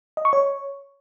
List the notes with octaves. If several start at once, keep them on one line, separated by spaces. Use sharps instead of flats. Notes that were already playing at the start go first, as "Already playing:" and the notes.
D#5
C#6
C#5